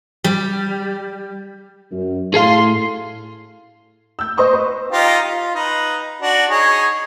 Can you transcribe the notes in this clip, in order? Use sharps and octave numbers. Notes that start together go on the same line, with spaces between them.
G3
F#2
A2 G#4 A4 F5 C6
E6 G6
C5 D#5 C6 C#6 D#6
B4
D#4 F4 G4
F4
D#4 B4
D4 F#4
D#4 G#4 C#5